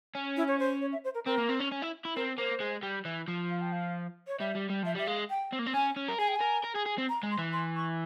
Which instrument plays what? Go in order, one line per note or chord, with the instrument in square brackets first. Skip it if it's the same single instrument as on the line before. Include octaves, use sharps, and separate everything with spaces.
[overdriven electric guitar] C#4
[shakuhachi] E4
C#5
C5
C#5
E5
C5
A#4
[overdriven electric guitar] C4 [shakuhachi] A#4
[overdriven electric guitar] A#3
C4
C#4
C#4
E4
E4
[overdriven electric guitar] C4 [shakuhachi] A#4
[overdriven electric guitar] A#3 [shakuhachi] C5
[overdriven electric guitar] G#3
G3
E3
F3
[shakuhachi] F5
G5
F5
C#5
[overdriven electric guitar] G3 [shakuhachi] E5
[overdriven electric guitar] G3
G3
[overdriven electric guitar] F3 [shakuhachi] E5
[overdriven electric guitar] G3 [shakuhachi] E5
[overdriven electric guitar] G#3 [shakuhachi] F5
[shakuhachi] G5
[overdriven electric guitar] C4
A#3
C4
[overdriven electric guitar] C#4 [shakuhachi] G#5
[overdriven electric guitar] C#4
A#4
[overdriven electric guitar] G#4 [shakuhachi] G#5
[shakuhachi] G5
G#5
[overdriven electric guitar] A#4
A#4
G#4
G#4
C4
[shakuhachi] A#5
[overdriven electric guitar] G#3
[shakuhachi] C6
[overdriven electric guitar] E3
[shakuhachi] C6
C#6